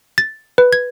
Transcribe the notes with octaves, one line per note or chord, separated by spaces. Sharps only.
A6
B4
G#6